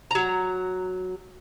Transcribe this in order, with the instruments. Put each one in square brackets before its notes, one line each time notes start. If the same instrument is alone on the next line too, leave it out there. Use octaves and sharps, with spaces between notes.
[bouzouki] F#3 A#5